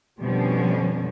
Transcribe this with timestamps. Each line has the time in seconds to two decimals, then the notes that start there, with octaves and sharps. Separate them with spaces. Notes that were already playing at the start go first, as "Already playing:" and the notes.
0.20 F2 B2 D3 F3 G3 C#4